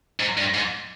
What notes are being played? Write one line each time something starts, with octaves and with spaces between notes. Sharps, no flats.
G#2
G2
G#2